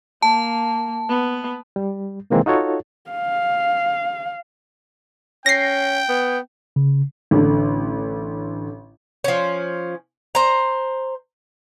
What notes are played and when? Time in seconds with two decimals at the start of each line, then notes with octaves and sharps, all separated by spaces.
0.22 A#3 A5
1.09 B3
1.76 G3
2.30 C3 D#3 E3 G#3 A#3 C4
2.46 D#4 F4 F#4 A4 C#5
3.10 F5
5.46 C#4 G5 A#6 C7
6.09 B3
6.76 C#3
7.31 A1 D3
9.24 F3 C#4
10.35 C5 A#5